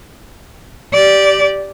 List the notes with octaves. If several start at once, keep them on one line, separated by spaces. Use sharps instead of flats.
G4 D5